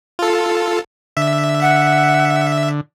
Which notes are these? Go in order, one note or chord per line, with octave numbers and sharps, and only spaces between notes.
F4 A4
D3 E5
F#5